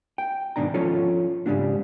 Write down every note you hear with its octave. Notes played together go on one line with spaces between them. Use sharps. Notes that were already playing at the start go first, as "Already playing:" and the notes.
G5
G#2 B2 D#3 D4 A#5
F3 C#4 F4 A4 C#5
G#2 C#3 G3 A3 A#3 D4